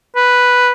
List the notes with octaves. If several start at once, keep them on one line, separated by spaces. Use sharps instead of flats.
B4